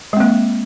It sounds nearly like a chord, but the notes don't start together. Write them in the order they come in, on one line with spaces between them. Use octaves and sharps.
G#3 C4 A#3